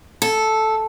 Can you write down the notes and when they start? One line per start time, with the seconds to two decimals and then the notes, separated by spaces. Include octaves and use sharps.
0.22 A4